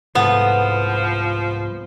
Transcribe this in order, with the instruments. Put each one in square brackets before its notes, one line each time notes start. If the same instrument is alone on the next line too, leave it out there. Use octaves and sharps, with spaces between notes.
[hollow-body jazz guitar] C2 G#2 A4 [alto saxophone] F3 [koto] B3